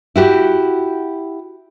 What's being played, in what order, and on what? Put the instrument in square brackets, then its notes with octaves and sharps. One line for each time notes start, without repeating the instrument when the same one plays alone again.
[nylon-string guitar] E4 F#4 G4